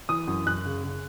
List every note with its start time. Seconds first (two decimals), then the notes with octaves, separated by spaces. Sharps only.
0.09 E3 D#6
0.27 F#2
0.46 F#2 F#6
0.65 C#3
0.84 C#3